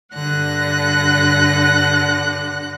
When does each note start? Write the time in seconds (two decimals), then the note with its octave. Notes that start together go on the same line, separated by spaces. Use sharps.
0.13 G2 D3 F#5 F#6 A#6